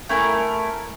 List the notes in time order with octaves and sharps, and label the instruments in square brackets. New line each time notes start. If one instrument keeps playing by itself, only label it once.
[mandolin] A3 E4 A#4 G#5